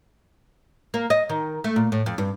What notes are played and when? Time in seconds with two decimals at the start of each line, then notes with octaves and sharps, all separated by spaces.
0.94 A#3
1.10 D#5
1.29 D#3
1.64 A3
1.76 A#2
1.92 A2
2.06 F2
2.18 G2